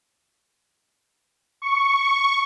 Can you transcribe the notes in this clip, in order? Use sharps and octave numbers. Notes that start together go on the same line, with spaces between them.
C#6